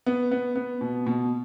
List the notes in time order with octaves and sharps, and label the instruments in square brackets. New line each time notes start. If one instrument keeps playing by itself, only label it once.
[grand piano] B3
B3
B3
B2
B2